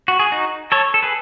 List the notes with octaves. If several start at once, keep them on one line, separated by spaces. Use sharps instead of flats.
F#4
G#4
D#4 F#4
A4 C#5
A4
G#4 B4